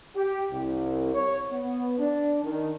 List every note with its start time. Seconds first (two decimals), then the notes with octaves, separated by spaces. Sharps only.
0.15 G4
0.51 C2
1.14 C#5
1.51 B3
1.99 D4
2.44 D#3